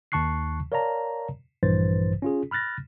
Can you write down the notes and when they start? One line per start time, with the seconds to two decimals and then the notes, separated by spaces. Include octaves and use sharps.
0.12 D#2 D#3 A5 C#6 F#6 C7
0.72 A#4 C#5 D5 F5 A5 A#5
1.63 A#1 G2 E3 B4 C5 A6
2.22 C#4 F4 G#4
2.51 B5 F6 F#6 A6 A#6